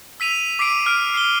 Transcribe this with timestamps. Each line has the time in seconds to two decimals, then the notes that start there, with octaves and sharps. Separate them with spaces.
0.20 E6 B6 D#7 F7
0.59 D6 B6 C7 D7
0.86 D6 F6 C7 D7
1.14 C7 F7 G7